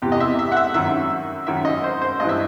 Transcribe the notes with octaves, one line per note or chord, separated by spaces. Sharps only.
E2 C3 E3 G4
D#5
E5
E5
F#5
E5
F#2 D#3 E5
F#2 D#3 E5
D#5
C5
C5
G2 E3 D#5
E5